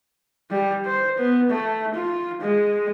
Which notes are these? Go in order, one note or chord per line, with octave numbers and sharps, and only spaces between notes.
G3
C5
B3
A3
F4
G#3